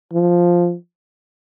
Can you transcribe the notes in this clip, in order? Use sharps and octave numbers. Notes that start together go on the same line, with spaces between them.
F3